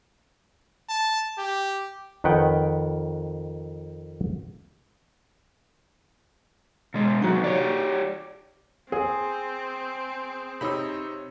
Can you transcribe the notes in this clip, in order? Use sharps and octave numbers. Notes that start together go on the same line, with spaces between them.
A5
G4
F2 D#3 B4 F#5 G5
B2 G#3
C3 F#3 D#4 F#4
G4 C#5 D5
C4 G#4
C3 D#4 C#5 B5 E6